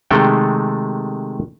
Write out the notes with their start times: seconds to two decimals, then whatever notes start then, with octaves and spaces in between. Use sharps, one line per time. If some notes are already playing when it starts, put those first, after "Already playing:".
0.11 C3 D#3 G#3 A3 A4 G5